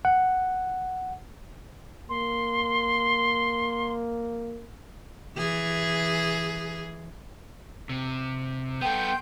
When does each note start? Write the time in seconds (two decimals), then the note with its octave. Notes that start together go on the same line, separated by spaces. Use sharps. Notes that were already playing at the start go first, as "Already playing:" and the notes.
0.05 F#5
2.09 A#3 C6
5.37 E3 G#4
7.89 C3
8.81 B3 A4 G5 C6 G6